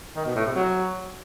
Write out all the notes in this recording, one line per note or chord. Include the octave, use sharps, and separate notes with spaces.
D#3
B2
A2
C3
F#3